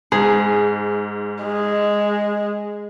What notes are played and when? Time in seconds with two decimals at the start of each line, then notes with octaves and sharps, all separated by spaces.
0.12 G#2 G#4
1.43 G#3